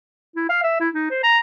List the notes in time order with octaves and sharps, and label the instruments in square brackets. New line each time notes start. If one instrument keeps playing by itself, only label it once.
[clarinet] E4
F5
E5
E4
D#4
C5
A#5